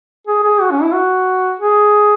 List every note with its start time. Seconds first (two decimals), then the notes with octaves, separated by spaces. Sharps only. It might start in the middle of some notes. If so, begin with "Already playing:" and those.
0.27 G#4
0.43 G#4
0.61 F#4
0.71 C#4
0.82 E4
0.94 F#4
1.60 G#4